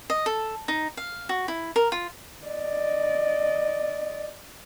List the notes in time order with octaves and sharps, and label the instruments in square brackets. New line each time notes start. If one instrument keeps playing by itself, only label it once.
[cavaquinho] D#5
A4
D#4
F5
F#4
E4
A#4
F4
[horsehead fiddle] D5 D#5